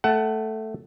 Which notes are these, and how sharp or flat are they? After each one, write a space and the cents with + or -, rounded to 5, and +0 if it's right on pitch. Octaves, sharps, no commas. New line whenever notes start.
A3 +0 F#5 +20 A5 +0